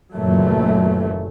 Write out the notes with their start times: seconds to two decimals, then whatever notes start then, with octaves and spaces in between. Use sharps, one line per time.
0.15 F#1 D#2 A#2 E3 F#3 A3